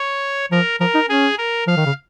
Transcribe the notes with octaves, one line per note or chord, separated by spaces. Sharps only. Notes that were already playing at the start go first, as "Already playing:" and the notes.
Already playing: C#5
F3 A#4
F3 A#4
D#4
C#4 G#4
A#4
F3 F5
D#3
C#3